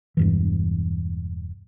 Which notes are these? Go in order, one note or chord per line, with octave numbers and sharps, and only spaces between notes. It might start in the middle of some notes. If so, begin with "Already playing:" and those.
E1 G2 E3